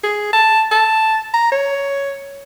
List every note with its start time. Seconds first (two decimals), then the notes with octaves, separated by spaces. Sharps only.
0.04 G#4
0.33 A5
0.71 A5
1.33 A#5
1.52 C#5